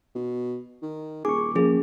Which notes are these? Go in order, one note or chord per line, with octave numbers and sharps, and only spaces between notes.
B2
D#3
D#1 G#4 C#6 D6
F3 A#3 C#4 G#4